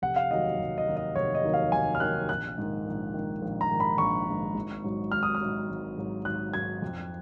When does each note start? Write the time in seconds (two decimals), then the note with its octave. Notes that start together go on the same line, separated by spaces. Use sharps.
0.02 F1 F#5
0.16 F5
0.30 D#2 D#3 F#3 D#5
0.59 F1
0.78 D#5
0.87 D#2 D#3 F#3
0.97 D#5
1.16 F1 C#5
1.35 D#5
1.44 D#2 D#3 F#3
1.54 F5
1.72 F1 G#5
1.95 F6
2.00 D#2 D#3 F#3 F#6
2.29 A#1 F#6
2.58 G#2 D#3
2.86 A#1
3.14 G#2 D#3
3.42 A#1
3.61 A#5
3.70 G#2 D#3
3.80 B5
3.98 A#1 C#6
4.27 G#2 D#3
4.55 G#1
4.84 G#2 F#3
5.12 G#1 F6
5.23 D#6
5.35 F6
5.41 G#2 F#3
5.68 G#1
5.97 G#2 F#3
6.25 G#1 F#6
6.53 G#2 F#3 G#6
6.82 F2